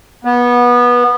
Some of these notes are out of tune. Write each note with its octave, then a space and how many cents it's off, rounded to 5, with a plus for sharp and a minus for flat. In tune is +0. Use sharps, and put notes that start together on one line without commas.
B3 -20